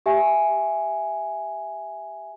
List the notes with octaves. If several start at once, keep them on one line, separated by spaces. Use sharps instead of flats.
G4 E5 G#5